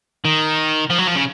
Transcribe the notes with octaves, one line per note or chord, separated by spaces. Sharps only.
D#3
F3
F#3
F3
C#3